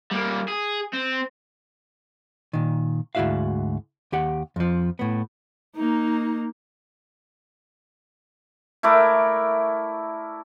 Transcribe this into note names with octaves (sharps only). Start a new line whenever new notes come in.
G3 A#3
G#4
C4
A#2 D#3
D2 G#2 E4 F#4 E5 F5
D#2 G4 F#5
F2 F3
A2 B3
A#3 D#4
A3 E4 A#4 D5